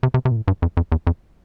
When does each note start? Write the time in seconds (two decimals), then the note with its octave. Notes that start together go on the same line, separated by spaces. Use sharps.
0.03 C3
0.14 C3
0.25 C3
0.31 A#2
0.37 A2
0.48 G2
0.62 F2
0.77 F2
0.92 E2
1.07 F2